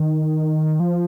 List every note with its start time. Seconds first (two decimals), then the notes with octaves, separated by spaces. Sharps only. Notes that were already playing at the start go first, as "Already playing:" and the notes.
Already playing: D#3
0.80 F3